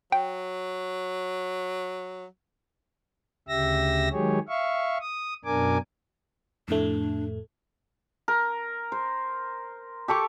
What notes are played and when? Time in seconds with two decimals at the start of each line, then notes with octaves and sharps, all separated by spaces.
0.12 F#3 G5
3.48 D2 C#3 G4 E5 E6 A#6
4.11 D#3 F#3 G#3 G4 G#4 C#5
4.48 E5 F5 C#6
5.00 D#6
5.45 F#2 B2 D4 A#4 G#5 D6
6.68 F2 A2 A3 D4
8.28 A#4
8.92 C5
10.08 G4 A4 C#6 D6